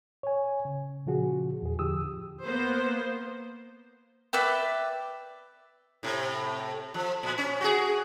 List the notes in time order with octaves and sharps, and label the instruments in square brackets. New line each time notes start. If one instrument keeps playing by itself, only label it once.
[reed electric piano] C#5 G#5
C#3
A#2 C#3 F3 F#4 G#4
E2 G#4
E2 D3 F3 G4 D#6 E6
[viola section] A#3 B3 C5
[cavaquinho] B4 D5 E5 G5
[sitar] A2 C3
F3
A#2
C#4
F#4 G#4